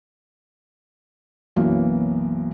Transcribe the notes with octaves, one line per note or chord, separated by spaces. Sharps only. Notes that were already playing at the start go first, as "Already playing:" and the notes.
B1 F#2 E3 A#3 B3